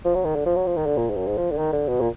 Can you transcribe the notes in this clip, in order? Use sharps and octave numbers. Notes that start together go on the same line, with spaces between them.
F3
F#3
D#3
D3
F3
F#3
F3
D#3
D3
A#2
G#2
F#2
G#2
F3
D3
D#3
D3
B2
A#2